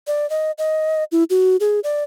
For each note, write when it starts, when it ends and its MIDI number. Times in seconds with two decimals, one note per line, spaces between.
0.07 0.29 74
0.30 0.52 75
0.58 1.04 75
1.12 1.24 64
1.30 1.57 66
1.60 1.80 68
1.84 2.04 74